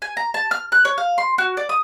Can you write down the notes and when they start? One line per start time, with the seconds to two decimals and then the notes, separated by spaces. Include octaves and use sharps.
0.02 G#5
0.17 A#5
0.34 A5
0.51 F6
0.72 F#6
0.85 C#5
0.98 F5
1.18 C6
1.38 F#4
1.57 D5
1.69 D#6